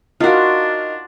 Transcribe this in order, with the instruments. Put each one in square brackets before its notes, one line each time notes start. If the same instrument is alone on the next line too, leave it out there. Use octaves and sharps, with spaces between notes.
[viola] D4 [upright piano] D#4 A#4 F5 [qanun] F4 F#4